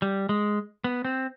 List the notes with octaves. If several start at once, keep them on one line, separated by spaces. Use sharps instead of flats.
G3
G#3
B3
C4